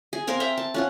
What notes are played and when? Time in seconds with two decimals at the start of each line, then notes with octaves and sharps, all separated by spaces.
0.13 G#4
0.27 C4 A#4 F5 C6
0.40 A#4 E5 G5 A#5
0.57 A5
0.74 C#4 F4 F#5